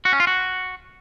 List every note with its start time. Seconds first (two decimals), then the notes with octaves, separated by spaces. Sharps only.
0.05 F#4
0.13 C#4
0.20 F4
0.27 F#4